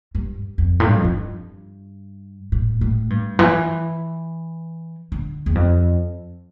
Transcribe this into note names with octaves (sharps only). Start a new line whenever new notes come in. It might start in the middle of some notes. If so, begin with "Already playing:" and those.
G2
F2
A2
G2
F2
G2
A2
A2
G2
E3
D3
E2
F2